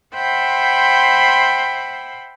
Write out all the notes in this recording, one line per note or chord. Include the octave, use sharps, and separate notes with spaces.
C5 E5 F#5 G5 B5 C6